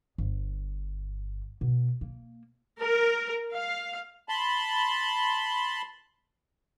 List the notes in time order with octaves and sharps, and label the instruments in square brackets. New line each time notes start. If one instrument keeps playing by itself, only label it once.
[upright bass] G1
B2
A#3
[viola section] A#4
F5
[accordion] A5 B5 C6